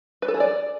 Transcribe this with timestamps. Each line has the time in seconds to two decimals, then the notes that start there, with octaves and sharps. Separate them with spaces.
0.22 B4
0.28 A4
0.34 G#4
0.40 D5